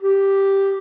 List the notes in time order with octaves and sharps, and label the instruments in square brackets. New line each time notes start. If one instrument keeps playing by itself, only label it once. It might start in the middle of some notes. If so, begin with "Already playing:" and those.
[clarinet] G4